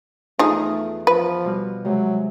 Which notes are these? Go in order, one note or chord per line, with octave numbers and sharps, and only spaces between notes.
E2 F3 A3 D#4 F4 G#4 F6
F3 B4
B2 G3 F6
C3 F#3 G#3 C4